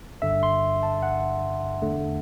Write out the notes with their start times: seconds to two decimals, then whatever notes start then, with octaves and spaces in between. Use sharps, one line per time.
0.22 G1 G2 D3 E5
0.43 C6
0.83 A5
1.03 F#5
1.82 E2 D3 A3